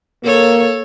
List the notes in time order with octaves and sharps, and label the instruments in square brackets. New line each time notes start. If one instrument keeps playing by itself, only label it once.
[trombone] A#3 [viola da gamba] A4 C#5